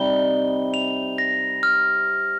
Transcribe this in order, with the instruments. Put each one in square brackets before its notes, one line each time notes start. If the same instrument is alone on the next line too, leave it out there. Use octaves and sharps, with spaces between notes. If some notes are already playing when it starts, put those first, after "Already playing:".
Already playing: [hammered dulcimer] C3 G3 D#4 [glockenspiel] G7
[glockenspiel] F7
A#6
F6